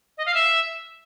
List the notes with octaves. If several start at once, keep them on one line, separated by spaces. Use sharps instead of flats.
D#5
F5
E5